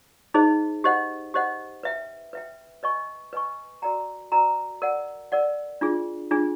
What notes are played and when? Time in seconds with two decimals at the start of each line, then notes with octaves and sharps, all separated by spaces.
0.34 D#4 G#4 C5 D#5
0.84 G4 C5 D#5 F#5
1.34 G4 C5 D#5 F#5
1.83 B4 E5 G5
2.33 B4 E5 G5
2.83 B4 D#5 G#5 C#6
3.33 B4 D#5 G#5 C#6
3.82 F#4 A#4 D5 G5 A#5
4.32 F#4 A#4 D5 G5 A#5
4.82 A#4 D5 F#5
5.32 A#4 D5 F#5
5.81 D4 F4 G#4
6.31 D4 F4 G#4